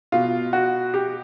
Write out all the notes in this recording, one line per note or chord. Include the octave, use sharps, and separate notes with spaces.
B2 F4
F#4
G4